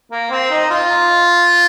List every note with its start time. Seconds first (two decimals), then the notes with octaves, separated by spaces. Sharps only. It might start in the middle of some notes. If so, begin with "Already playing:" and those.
0.12 A#3
0.31 C4
0.50 D#4
0.70 F4